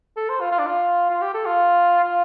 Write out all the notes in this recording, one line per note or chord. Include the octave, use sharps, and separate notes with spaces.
A4
C5
F4
F4
D4
F4
F4
G4
A4
F4
F4